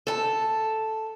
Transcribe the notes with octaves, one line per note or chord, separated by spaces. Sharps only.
A4 A5